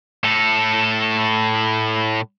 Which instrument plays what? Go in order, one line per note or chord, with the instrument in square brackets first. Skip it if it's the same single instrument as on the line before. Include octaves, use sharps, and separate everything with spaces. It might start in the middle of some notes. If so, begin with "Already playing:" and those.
[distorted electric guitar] A2 A4